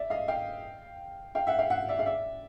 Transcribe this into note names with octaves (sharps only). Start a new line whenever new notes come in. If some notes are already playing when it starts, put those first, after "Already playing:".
Already playing: D5 E5
D#5 F5
F5 G5
F5 G5
E5 F#5
F5 G5
E5 F#5
D5 E5
F5
D5 E5